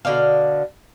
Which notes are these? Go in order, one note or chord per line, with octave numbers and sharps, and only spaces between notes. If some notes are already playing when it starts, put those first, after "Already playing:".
B2 D3 D5 F5